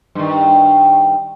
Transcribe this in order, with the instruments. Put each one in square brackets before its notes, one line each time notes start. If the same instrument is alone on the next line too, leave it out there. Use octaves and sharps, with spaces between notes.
[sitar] G2 D#3